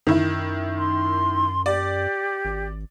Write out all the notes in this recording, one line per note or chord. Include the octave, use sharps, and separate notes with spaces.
F#2 D#3 E4
C6
G4 D5
G#1